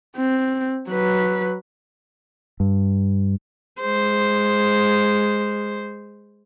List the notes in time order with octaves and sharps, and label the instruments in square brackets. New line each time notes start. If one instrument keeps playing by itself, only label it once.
[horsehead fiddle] C4
F#3 B4
[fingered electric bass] G2
[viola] G#3 C5